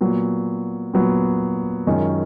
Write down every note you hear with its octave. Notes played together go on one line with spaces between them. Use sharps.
A#2 F#3 B3
A#2 F#3 B3
F#2 D#3 G#3 C#4 F4